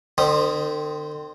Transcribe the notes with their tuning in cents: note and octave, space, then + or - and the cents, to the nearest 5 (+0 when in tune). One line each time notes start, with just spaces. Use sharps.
D3 +45 C4 -20 D#6 +0